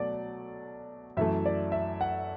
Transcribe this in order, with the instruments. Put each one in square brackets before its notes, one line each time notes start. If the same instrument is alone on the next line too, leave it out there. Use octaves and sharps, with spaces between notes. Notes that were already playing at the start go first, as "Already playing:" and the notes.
Already playing: [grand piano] B2 F#3 A3 D5
F#2 E3 A3 E5
D5
E5
F#5